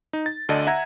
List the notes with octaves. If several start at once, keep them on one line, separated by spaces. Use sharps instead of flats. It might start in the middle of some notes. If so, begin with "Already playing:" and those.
D#4
A6
D2 D3 D5 D#5 A5 D#7
E5 F#5 A#5 G#6